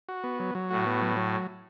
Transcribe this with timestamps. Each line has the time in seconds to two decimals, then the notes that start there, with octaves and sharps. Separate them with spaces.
0.09 F#4
0.24 B3
0.40 F#3
0.55 F#3
0.70 A2 F#4
0.86 B3
1.01 F#3
1.17 F#3